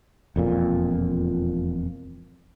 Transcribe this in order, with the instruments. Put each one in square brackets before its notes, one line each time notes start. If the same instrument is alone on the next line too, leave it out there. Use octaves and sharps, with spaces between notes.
[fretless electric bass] E1 F2 A#2